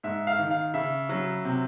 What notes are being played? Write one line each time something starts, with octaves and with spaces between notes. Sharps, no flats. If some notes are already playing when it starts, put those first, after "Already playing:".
G#2 E5
F5
D#3
F5
C#3 E5
F#3
C3